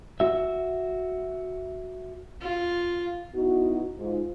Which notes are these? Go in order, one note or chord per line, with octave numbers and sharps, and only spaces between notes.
F#4 E5
F4
B3 D#4 E4 F#4
G#2 F4